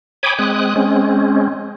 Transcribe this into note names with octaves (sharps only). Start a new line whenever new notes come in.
C#5 G5 G#5 B5 D6 D#6
G#3 C4 D#6 F#6
G#3 C4 C#4